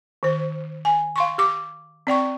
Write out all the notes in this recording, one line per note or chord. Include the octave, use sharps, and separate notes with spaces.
D#3 C5
G#5
F5 C6 C#6
G4 D6
C4 D5 G5 C#6